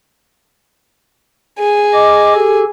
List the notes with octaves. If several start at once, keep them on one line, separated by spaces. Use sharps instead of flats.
G#4
D#5 D6
G4 A4